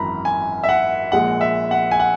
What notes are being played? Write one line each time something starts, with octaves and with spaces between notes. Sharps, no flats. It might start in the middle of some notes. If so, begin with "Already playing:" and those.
Already playing: G#1 F#2 E3 A#5 B5
G#5
E5
F#5
A#1 A#2 G#3 F#5
E5
F#5
G#5
F#5